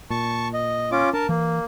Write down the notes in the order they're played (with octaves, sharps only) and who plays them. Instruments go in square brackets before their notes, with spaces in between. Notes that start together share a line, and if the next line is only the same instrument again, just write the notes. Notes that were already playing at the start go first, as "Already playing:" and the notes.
[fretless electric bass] A#2 [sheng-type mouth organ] A5 C#6
[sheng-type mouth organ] D#5
C#4 F4 D6
[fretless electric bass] D4 [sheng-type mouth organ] A#4 A5
[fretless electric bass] E3 [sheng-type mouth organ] A#3